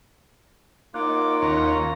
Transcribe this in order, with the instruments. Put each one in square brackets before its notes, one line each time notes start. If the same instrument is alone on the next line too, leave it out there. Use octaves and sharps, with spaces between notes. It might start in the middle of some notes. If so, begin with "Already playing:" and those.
[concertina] A#3 F4 [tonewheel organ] D#4 C#5 F#5 [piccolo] D6
[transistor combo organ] D#2 C#4 [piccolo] A#5